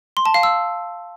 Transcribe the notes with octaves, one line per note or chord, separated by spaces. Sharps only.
C6
A5
F5
E6